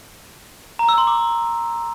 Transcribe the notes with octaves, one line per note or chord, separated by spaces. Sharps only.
A#5
E6
C6
D6